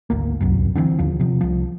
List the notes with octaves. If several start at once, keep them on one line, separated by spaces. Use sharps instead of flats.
G#1 D2 A#3
D1 C2 F#2
D3 E3 A3 C4
D#2 D3 F3
C3 F3
C2 F3